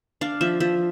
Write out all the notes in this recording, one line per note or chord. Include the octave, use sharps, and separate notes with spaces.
D4 F5
F3 E5
F3 E5